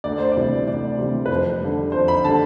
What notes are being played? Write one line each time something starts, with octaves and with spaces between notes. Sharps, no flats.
D2 D5
C5
C3 E3 G3 D5
D2 D5
C3 E3 G3
B4
F2 C5
D3 G3
F2 C5
B5
D3 G3 A5